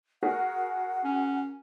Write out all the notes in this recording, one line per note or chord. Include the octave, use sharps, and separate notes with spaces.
F#4 G#4 A#4 F#5
C#4